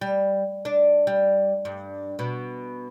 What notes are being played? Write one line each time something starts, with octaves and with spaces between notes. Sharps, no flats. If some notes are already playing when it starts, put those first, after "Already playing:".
G3
D4
G3
G2
B2